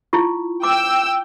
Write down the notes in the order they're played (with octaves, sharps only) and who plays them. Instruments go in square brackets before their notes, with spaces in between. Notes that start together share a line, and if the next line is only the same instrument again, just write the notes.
[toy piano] E4 F4 C#6
[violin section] G5 E6 [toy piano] D6